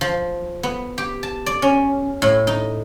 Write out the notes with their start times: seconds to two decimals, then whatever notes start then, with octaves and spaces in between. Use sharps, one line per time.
0.01 F3
0.63 B3
0.98 G4
1.23 A5
1.46 D5
1.62 C#4
2.22 A2
2.47 D#4